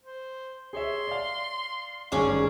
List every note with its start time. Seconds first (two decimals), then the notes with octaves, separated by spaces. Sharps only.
0.03 C5
0.73 G#4 C#5 E5 C6
1.08 D5 F5
2.12 G#1 G2 C#4 D4 G#4